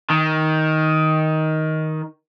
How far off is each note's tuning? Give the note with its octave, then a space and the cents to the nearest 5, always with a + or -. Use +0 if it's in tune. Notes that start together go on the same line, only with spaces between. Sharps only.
D#3 +10